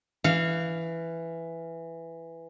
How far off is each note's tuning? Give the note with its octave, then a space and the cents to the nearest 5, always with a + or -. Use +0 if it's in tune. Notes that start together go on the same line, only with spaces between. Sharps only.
E3 +5 F5 -10